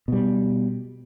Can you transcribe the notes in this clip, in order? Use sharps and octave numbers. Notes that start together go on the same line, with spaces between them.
B2 G3